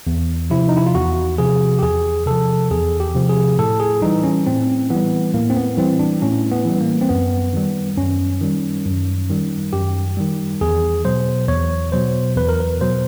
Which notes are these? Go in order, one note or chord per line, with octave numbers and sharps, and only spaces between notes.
E2
C3 F3 E4
D#4
E4
F4
E2 F#4
C3 F3 G#4
G4
E2 G#4
C3 F3 A4
E2 G#4
G4
C3 F3
G#4
A2 A4
G#4
E3 G3 D#4
C#4
A2 C4
E3 G3 B3
A2 A#3
C4
B3
E3 G3 C4
D4
A2 C#4
B3
E3 G3
A#3
C4
F#2 B3
D#3 G3
F#2 C#4
D#3 G3
F#2
D#3 G3
F#2 G4
D#3 G3
E2 G#4
B2 F#3 C5
E2 C#5
B2 F#3 C5
E2 B4
A#4
B4
B2 F#3 C5